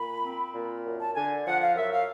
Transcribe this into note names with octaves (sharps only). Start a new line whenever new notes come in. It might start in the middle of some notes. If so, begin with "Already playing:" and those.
Already playing: A#2 B5
C4
A#2
F#2
A5
D3 G#5
F3 F#5
F5
F#2 E5
F5